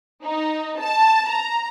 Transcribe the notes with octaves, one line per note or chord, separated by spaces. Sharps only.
D#4
A5
A#5